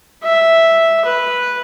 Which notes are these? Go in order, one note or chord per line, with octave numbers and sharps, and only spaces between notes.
E5
B4